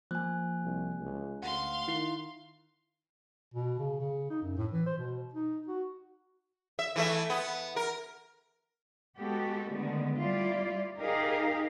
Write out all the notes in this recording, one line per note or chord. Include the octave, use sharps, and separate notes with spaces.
F3 A#3 G#5 F#6
C2
C#2
D2 F5 F#5 C6
D#3 E4 C7
B2
C#3
C#3
D#4
F#2
A2
E3
C5
B2
D#4
F#4
E5
E3 A3 E5
B3
A#4
G#3 B3 F#4 G4 A4
D3 D#3 G#3 A3 B3
G3 E4 F4 D5
D#4 G4 G#4 A#4 D#5 F5